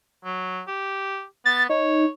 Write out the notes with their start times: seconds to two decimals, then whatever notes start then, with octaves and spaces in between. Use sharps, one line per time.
0.25 F#3
0.67 G4
1.45 B3 A6
1.69 D#4 C#5